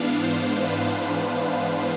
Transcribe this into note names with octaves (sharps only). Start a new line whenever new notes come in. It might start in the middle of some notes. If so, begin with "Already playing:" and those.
Already playing: G#2 E3 B3 D4 F5
C5
B4